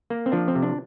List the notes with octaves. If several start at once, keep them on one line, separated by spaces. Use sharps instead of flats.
A#3
C4
F3 D4
C4
C3
D4